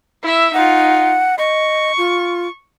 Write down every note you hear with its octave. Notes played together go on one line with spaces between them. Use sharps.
E4 E5
D#4 F4 F#5
D#5 C#6
F4